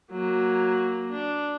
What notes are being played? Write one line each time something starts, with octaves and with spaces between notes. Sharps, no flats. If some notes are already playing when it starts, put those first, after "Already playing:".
F#3 A#3
D4